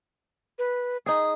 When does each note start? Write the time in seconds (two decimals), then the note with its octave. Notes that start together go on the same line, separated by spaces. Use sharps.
0.59 B4
1.06 D#4 G#4 D#6